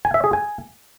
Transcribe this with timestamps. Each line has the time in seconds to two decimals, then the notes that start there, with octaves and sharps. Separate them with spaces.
0.05 G#5
0.14 E5
0.24 G#4
0.33 G#5